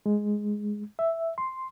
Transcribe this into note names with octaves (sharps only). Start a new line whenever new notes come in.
G#3
E5
C6